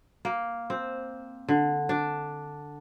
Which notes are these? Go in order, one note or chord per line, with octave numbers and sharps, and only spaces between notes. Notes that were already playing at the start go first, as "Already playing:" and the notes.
A#3
C4
D3
D4